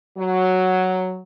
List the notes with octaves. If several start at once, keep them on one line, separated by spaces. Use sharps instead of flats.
F#3